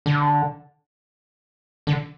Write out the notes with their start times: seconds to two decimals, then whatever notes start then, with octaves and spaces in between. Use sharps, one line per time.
0.06 D3
1.87 D3